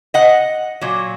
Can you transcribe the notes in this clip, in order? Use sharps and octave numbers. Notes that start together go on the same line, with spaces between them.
D#5 F#5
A#2 F#3